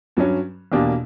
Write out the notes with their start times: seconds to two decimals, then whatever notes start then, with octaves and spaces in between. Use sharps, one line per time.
0.17 G2 F#3 C#4
0.72 E2 B2 A#3 D4 G4